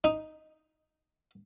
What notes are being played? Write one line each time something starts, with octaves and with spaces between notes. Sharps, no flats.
D#4